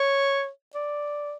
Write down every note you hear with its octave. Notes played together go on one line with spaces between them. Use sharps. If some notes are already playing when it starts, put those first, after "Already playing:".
Already playing: C#5
D5